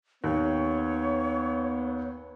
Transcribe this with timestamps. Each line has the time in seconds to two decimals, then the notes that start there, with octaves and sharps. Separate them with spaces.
0.24 D#2 B3 C#5